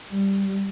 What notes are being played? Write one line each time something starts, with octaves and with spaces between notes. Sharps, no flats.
G3